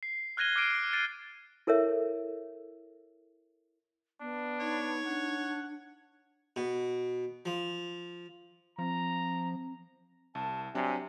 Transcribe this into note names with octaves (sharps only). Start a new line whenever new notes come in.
C7
F6 F#6 G#6 A#6 D#7 G7
D6 F6 F#6 C7 D7 D#7
A6 C7 D7 D#7
E4 A4 A#4 C#5 E5
B3 D4
D#4 C#5
D4 F#5
B2
F3
F3 C4 A#5
C2 A5
C3 F#3 C4 D4 G#5